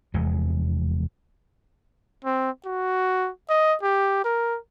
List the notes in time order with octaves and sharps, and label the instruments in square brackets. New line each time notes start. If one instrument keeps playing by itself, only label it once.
[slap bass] F1 E2 G#3
[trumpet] C4
F#4
D#5
G4
A#4